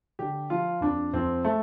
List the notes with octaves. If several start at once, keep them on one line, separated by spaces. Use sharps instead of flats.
D3 G4
F3 F4
F2 D4
F2 C4
A3